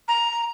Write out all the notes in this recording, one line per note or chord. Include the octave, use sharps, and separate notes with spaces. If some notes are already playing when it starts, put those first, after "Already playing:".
A#5